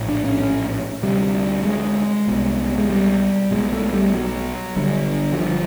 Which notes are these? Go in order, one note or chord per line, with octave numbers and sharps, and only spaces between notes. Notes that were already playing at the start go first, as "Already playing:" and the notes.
Already playing: A#1 A2
D4
C#4
C#4
D2 C3 G3
G#3
C2 B2
G#3
G3
B1 B2 G#3
A3
G3
F#3
G1 G2 D3
F#3
F3